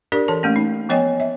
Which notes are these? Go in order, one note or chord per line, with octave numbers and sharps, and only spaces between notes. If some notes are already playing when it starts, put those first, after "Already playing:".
D4 G4 A#4 D5
E3 A4 A5
A3 A#3 C#4
D#4
F3 B3 C#5 D#5 G5 G#5
E5